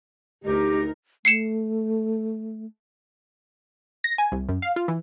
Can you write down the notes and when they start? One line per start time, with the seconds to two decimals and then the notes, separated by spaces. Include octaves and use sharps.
0.44 D2 D#4 G4 A#4
1.25 A3 C7 C#7 E7
4.04 A#6
4.18 G#5
4.32 C2
4.49 F#2
4.62 F5
4.76 F4
4.88 E3